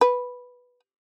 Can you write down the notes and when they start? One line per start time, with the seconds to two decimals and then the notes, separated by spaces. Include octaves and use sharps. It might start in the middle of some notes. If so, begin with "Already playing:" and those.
0.01 B4